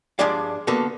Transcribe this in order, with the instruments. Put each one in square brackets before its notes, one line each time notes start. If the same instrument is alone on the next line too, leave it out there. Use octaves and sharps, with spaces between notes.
[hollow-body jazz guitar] G2 F3 G#3 D4 D5 F5
D3 A#3 B3 F#4 A4